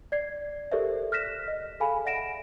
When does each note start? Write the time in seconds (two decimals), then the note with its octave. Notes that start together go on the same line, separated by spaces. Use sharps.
0.12 D5 G#6 C7
0.72 G4 A4 A#4 C5 D5 E5
1.12 F6 F#6 A#6 B6 E7
1.48 D#5
1.80 G#4 A4 F5 G5 G#5 B5
2.05 D5 E5 F#5 A#6 D7 E7